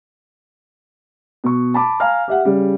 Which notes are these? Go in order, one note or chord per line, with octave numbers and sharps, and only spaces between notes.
B2 C#6
A5 B5 D6
F5 G#5 A#5 F6
G4 E5 F#5
C#3 G3